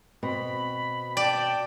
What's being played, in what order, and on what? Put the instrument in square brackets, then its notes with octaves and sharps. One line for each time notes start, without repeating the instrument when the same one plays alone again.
[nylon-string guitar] B2 C4 [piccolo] B5
[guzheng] D5 [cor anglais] G5 [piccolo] A5